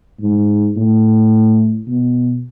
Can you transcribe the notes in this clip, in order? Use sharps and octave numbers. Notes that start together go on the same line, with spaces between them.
G#2
A2
B2